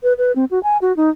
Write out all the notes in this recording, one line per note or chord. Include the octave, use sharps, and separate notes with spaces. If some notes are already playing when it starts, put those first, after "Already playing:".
B4
B4
C4
F#4
G#5
F#4
D#4